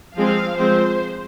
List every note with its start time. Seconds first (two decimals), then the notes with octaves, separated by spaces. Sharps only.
0.16 F3 G#3 C4 F5
0.59 F3 G#3 C4 C5